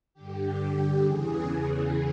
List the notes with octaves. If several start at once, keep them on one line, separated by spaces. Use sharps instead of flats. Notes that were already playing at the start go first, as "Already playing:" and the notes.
G2 D3 G4
G4
E2 C#3 E3 G#4
G#4